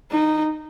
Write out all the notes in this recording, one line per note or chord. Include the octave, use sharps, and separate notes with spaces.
D#4